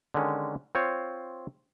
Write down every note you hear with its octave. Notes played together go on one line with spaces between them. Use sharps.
D3 D#3 G#3 C#4
C4 F4 C5 C#5